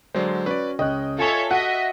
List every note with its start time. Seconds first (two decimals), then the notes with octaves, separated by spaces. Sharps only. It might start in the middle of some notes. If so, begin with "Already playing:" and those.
0.14 D3 F#3 G#3 C5 D5
0.46 C#4 F#4 B4 D5
0.79 C#2 C#4 D#5 G5 F#6
1.18 F4 A4 C#5 E5 G#5 C#6
1.51 F#4 D#5 E5 F#5